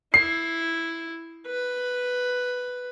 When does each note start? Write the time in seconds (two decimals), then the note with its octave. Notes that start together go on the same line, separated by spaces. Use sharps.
0.14 E4 C7
1.47 B4